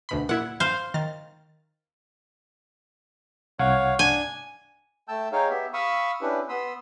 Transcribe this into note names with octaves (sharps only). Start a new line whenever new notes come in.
D2 B2 B5
A#2 E4 F#5 G#6
C5 F5
D#3 F6 A6
C2 C#5 F5 F#5 G#6
D4 G#5
A3 G5 A5 E6 G6
D#4 G#4 C#5 F5 G5
B3 G4 E5
F5 B5 C#6 D#6 E6
C#4 D4 E4 G4 B4
B3 B5 C6 D#6 E6